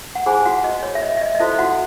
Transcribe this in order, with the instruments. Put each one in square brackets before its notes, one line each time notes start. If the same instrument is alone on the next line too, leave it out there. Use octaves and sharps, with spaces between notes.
[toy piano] F#5
E4 G#4 C5 G#5
F#4 F#5
D#5
C#5
E5
D#5
E5
D#5
D#5
E4 F#4 A4 C5 E5
F#4 F#5